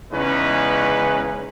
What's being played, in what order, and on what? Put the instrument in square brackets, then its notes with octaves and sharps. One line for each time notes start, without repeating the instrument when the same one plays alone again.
[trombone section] E2 C#3 G#3 C#4 D#4 B4